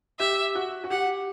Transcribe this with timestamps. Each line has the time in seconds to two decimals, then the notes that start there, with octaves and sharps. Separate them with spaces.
0.19 G4 E5
0.55 F#4
0.84 F#4
0.90 G4 F#5